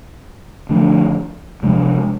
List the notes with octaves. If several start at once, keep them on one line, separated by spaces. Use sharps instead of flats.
D3 F3 A3 D4
C3 F3 G#3 D4